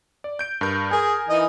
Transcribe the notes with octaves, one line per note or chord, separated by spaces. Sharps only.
D5
G6 D7
G2 A#4 G6
G#4 A#4 G#5
E3 D#4 D#5